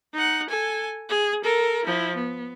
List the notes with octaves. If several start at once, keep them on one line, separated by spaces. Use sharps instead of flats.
D#4 F#5
A4 G#5
G#4
A4 A#4
F3 E4
B3